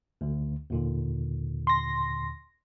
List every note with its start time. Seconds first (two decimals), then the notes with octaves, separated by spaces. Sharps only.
0.21 D2 D3
0.70 D#2 A#2 D3
1.67 C6 A#6